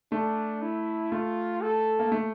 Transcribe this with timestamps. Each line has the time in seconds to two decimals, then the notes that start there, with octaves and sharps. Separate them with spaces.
0.12 A3 D4
0.62 E4
1.12 A3 F4
1.62 A4
1.99 A#3
2.12 A3